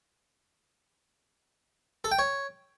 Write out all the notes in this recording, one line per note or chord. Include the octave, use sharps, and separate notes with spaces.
A4
G5
C#5